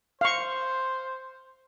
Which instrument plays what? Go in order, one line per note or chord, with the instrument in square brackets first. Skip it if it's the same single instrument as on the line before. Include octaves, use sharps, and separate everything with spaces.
[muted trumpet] C5 [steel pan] F5 C#6